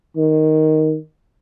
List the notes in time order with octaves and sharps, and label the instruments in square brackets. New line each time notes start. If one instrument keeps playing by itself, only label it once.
[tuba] D#3